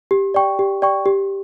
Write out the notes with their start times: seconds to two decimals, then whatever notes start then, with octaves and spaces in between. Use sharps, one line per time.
0.11 G4
0.34 D5 G5 C#6
0.59 G4
0.82 D5 G5 C#6
1.06 G4